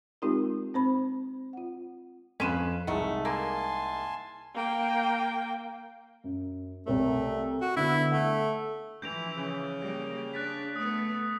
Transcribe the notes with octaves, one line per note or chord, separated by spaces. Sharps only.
G#3 C4 D#4 F4 G4 A#4
C4 C5 B5
F4 F#5
F2 C#4 F4 B4 D#7 E7
C2 G#3 A3 D#4 F#5
A#3 G#5 A5 C6
A#3 G5
F#2
C2 A3 A#4 C#5
F#4
D3 B3 E4
A3 F#5
E3 F3 G6 D7 F7
C#3
G3 A#3
D4 F#6 A6 B6
A3 B3 D#6